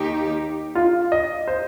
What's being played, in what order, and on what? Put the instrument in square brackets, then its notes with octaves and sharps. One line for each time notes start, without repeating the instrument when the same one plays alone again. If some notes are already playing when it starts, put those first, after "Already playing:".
Already playing: [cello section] D#2 D#3 A#3 D#4 G4
[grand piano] F4
D#5
C5